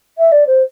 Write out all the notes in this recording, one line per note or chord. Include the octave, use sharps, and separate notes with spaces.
E5
D5
C5